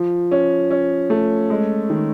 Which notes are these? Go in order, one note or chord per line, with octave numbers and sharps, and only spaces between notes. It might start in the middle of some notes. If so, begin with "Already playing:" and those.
Already playing: F3
C#4
C#4
A3
G#3
D#3